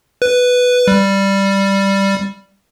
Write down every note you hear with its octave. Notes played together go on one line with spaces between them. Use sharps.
B4
G3